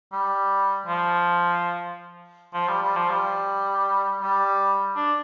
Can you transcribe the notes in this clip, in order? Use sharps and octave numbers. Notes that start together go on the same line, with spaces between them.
G3
F3
F3
G3
G3
F3
G3
G3
D4